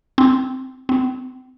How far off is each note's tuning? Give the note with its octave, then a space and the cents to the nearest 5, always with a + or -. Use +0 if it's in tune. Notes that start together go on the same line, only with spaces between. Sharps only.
C4 -10
C4 -35